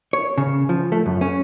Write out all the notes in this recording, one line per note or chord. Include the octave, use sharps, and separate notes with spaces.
C#5
C#3
F3
A3
F#2
C#4